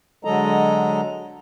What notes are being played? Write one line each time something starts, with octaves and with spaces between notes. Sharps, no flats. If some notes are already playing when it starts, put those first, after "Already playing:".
D3 F#3 G#3 A4 D#5 A#5